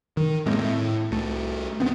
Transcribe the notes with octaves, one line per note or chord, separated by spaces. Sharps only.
D#3
A2 G#3 A#3 C4
A2
C2 A3
D1 G#2 B3 C4